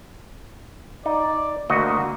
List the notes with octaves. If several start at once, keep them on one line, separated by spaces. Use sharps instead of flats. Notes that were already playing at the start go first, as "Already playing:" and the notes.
D#4 D5
D2 A#3 F#4 D#5